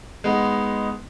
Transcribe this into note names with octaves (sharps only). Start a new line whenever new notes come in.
G#3 B3 D#4